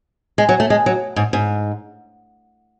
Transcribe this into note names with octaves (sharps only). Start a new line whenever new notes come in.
G#3
F#3
A3
G#3
F#3
G#2
G#2